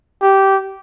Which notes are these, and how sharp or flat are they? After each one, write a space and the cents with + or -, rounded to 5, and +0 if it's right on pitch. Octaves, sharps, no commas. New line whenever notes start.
G4 -15